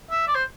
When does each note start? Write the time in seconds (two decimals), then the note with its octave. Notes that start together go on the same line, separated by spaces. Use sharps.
0.10 E5
0.27 D5
0.35 C5